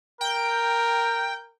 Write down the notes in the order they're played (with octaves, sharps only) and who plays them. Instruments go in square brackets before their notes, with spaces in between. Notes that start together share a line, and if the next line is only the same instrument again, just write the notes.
[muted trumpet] A#4 [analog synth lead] G5